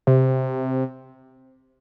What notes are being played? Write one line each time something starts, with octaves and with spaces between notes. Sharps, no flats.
C3